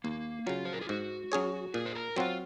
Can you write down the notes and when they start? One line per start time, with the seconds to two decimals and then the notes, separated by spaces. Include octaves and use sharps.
0.04 D#2 A#3
0.46 C#3 F#3 F4
0.65 C5
0.73 A#4
0.81 G#4
0.89 G#2 F#4
1.32 F#3 C#4 G#4 C#5
1.74 A#2 G#4
1.85 C5
1.95 A#4
2.16 F#3 C4 F4 F#4